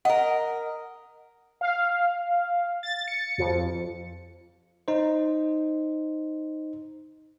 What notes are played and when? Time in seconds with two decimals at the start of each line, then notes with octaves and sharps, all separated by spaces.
0.05 A#4 D#5 F#5
1.61 F5
2.83 A6
3.08 C#7
3.38 F2
4.88 D#4 C5